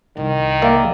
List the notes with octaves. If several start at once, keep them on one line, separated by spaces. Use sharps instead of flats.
C2 D#3
A#3 D5 E5